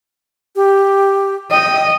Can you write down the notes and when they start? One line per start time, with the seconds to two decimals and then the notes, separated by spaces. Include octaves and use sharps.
0.56 G4
1.51 D#5 G5